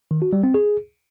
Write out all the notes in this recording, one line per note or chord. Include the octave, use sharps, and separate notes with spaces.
D#3
F#4
G3
C4
G#4